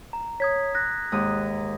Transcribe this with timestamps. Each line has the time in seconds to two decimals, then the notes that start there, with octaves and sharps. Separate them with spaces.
0.13 A#5
0.40 C#5 D#6 G#6 B6
0.75 F#6 A#6
1.12 D#2 G#2 D#6